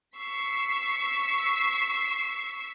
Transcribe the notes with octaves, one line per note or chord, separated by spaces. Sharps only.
C#6 E6 B6 C7